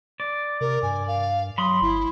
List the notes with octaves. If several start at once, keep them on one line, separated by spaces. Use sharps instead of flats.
D5
C3 A#4
G2 G#5
F5
F#3 B5 C6 D#6
G1 E4